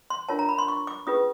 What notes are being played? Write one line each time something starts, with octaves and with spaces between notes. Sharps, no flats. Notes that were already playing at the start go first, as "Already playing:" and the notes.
C6
D4 F4 A#4 C#5 A5
A#5
B5
C6
C#6
D6
C#4 F4 G#4 B4 D#6